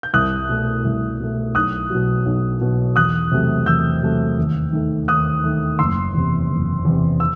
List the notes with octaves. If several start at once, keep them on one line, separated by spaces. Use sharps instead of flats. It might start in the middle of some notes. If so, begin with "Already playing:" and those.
G6
C2 D#6 F#6
B2 A3
C2
B2 A3
B1 D#6 F#6
B2 F#3
B1
B2 F#3
E2 D#6 F#6
C3 F#3 A3
E2 E6 G6
C3 F#3 A3
D#2
D#3 A3
D#2 D#6 F#6
D#3 A3
F#1 C6 E6
E2 C3
F#1
E2 C3
E6